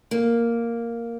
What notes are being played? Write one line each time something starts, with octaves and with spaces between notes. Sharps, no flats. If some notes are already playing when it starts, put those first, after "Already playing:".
A#3